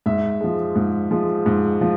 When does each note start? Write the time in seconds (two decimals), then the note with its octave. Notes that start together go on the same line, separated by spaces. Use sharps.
0.06 G#2 E5
0.41 F3 G#3
0.76 G#2
1.11 F3 G#3
1.46 G#2
1.81 F3